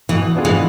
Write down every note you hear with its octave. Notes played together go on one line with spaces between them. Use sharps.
B2 E3
B3 D4 F4 G#4
E3 G#3